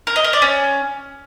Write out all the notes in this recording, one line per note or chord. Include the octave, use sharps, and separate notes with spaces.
A#4
D#5
A#4
D5
C#4